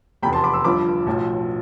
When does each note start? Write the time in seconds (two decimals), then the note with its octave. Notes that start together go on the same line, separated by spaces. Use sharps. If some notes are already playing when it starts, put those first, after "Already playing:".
0.22 F1 E2 C3 G5 B5
0.33 A5 C6
0.44 B5 D6
0.53 C6 E6
0.64 G1 G2 F3 B5 D6
1.06 B1 A2 F3